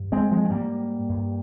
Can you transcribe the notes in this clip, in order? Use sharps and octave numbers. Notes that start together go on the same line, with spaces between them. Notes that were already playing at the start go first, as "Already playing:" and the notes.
Already playing: G2
G#3 C4
F3 G#3
C4
G#2 G3 A#3
G2